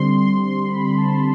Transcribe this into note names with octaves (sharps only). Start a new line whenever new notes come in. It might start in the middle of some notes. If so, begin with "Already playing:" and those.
Already playing: D3 G3 C4 C6
C6
C6
B5
A5